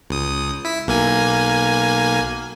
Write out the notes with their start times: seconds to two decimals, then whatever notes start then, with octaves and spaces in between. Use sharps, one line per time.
0.10 C#2 D#6
0.65 E4 B6
0.87 B1 A#3 G#5